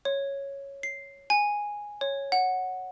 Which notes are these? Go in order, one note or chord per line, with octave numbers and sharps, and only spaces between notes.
C#5
C7
G#5
C#5
F#5